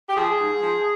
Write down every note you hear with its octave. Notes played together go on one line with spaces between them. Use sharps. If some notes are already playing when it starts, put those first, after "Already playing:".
G4
F3 G#4
G#2
F3